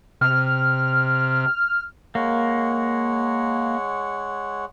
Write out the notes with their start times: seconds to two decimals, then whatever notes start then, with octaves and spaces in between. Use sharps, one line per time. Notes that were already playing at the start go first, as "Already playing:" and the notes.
0.21 C3 F6
2.15 G#3 A#3 C#5 F#5